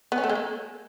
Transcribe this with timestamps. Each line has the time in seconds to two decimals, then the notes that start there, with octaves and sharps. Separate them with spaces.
0.12 B3
0.18 C#4
0.24 A3
0.30 G#3
0.35 A#3